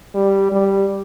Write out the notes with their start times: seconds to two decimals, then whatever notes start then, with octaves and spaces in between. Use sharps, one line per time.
0.15 G3
0.52 G3